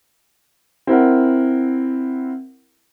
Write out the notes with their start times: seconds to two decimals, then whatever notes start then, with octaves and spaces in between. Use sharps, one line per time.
0.87 C4 E4 A#4 F#5